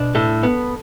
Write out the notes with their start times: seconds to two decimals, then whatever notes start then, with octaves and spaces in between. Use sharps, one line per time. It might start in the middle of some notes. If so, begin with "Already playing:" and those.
Already playing: B2 D4
0.15 A2 A4
0.43 B3